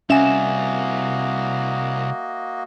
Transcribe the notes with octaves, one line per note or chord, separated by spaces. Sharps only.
C2 A#3 C#4 F#4 D#5 E5 G#5 E7